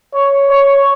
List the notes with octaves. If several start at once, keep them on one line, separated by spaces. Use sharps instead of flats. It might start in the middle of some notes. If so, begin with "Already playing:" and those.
C#5
C#5